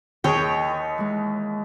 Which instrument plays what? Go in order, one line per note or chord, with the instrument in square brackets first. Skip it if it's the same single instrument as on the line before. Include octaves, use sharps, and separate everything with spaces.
[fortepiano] D#2 G#4 [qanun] C#5 G5 [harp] D#5
[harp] E3 G#3